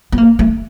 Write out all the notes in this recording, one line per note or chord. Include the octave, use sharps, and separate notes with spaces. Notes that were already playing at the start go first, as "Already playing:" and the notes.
B3
A#3
A3